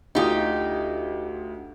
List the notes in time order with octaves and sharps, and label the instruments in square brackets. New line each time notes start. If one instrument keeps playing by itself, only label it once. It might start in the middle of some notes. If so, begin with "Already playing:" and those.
[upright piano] D2 F4 D#6 [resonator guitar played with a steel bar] D#4 G4